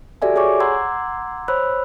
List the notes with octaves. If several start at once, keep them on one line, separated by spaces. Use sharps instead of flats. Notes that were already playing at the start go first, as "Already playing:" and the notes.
F#4 G4 A4 D5 E5 G#5
G#4 C#5 G#5 C#6 D6
F#5 A#5 C6 D6 E6 G#6
C5 C#5 B5 E6 F#6